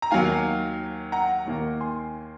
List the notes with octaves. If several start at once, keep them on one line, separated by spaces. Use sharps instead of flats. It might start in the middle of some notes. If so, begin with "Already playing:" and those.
A#5
D#2 D#3 F#3 A#3 F5 G#5
F#5 A#5
D#2 D#3 A#3
G#5 C6